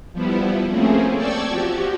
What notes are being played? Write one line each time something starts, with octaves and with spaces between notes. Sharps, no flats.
F3 G3 B3 E4
A3 A#3 C4 C#4 G#4
D5 G5 A5 C#6 E6 G#6
F3 F#4 G4